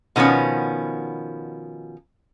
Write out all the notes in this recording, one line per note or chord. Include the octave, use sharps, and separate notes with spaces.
B2 D#3 F3 B3 C#4